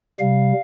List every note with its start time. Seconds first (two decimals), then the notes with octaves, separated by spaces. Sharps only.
0.20 C3 G3 F5